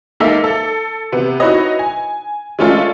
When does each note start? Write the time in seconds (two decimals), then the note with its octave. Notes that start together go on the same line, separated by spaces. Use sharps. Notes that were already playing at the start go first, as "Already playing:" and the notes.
0.20 G#3 A#3 D#4 A4 E5 F5
0.44 A4
1.12 C3 B3
1.40 D#4 E4 F#4 B4 C#5 D#5
1.79 G#5
2.59 G#3 A3 C#4 D4 F4 A4